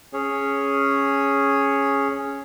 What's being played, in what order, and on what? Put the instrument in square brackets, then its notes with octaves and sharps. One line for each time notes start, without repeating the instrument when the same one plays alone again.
[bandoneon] C#4 G#4 C#5